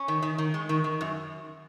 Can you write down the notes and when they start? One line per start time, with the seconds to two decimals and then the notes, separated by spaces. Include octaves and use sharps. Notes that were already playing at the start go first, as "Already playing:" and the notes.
Already playing: C#4
0.08 D#3
0.22 D#3
0.38 D#3
0.54 G#3
0.69 D#3
0.84 D#3
1.01 F#2